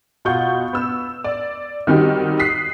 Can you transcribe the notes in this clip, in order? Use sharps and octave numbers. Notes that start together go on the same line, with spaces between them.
B2 F4 F#5 C#6 G6
B3 E6
D5
D#3 G3 C4 D#4 F#4 G4
D#6 F#6 B6 C7